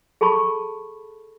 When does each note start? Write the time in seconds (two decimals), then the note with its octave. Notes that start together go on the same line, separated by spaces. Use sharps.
0.21 G#4 A4 A5 B5 C#6